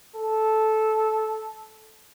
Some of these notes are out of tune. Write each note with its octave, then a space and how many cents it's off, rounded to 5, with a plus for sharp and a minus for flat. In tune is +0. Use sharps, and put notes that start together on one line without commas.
A4 -10